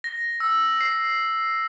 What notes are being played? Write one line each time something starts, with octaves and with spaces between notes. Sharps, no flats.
A#6
E6
C7